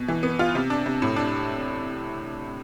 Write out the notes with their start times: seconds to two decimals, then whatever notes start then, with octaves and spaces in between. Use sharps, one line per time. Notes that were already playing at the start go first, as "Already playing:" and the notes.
Already playing: B2
0.08 E3
0.23 B3
0.39 F4
0.55 C3
0.70 D4
0.86 C3
1.02 A2
1.16 D4